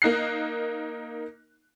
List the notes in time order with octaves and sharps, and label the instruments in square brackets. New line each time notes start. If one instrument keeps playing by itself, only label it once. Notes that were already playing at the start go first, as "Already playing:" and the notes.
[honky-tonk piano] A#3 D#4 F#6 C7